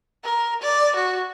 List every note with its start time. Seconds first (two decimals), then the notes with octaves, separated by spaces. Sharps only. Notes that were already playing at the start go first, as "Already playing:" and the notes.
0.24 A#4
0.61 D5
0.95 F#4